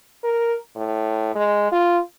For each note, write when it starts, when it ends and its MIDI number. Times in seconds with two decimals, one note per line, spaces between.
0.23 0.55 70
0.76 1.31 45
1.35 1.70 56
1.72 1.99 65